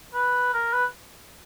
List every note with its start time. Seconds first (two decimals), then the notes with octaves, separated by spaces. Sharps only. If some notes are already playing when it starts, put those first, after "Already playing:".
0.14 B4
0.54 A#4
0.73 B4